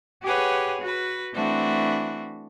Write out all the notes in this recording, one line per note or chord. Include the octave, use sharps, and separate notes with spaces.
G4 G#4 B4 C#5 F#5
F#4 B4
E3 A3 C4 D4 F#4